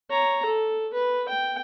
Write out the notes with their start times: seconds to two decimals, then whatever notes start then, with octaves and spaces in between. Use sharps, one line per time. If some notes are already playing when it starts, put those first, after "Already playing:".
0.10 C#5 A#5
0.46 A4
0.93 B4
1.29 G5